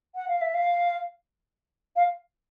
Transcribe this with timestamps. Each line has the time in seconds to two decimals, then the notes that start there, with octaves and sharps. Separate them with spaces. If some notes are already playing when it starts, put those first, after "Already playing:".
0.15 F#5
0.28 F5
0.41 E5
0.53 F5
1.95 F5